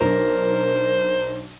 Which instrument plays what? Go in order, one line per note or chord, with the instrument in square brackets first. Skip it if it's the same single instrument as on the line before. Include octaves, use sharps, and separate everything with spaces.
[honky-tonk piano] B1 D4 [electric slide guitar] A#4 [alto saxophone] C5